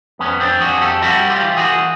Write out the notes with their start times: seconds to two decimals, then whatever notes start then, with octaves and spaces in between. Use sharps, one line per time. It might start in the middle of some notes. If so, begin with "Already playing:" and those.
0.19 F2 B3 C#4
0.40 C4 D4
0.61 F2 F#4 G#4
0.81 G4 A4
1.02 G3 E4 F#4
1.30 F4 G4
1.43 E3
1.57 F#4 G#4